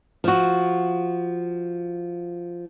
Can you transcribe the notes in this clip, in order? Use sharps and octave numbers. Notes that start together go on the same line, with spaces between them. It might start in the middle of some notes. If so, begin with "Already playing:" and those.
F3 F#4